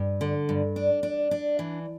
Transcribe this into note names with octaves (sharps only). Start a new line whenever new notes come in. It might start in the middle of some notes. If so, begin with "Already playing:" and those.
Already playing: G2
D3
G2
D4
D4
D4
E3